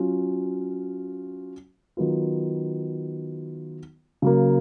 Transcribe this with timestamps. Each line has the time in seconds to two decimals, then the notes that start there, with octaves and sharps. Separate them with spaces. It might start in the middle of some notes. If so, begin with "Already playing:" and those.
Already playing: F#3 C#4 F4
1.97 D#3 F#3 B3 F4
4.22 C#3 F#3 A#3